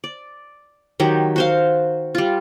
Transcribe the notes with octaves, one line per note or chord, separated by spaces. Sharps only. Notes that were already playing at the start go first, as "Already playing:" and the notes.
D5
D#3 F#3 G4
F#4 C5 F5
G3 F4